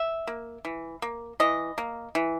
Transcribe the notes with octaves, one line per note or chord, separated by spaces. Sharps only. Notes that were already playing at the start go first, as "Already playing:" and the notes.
Already playing: E5
A#3
E3
A#3
E3 D#5
A#3
E3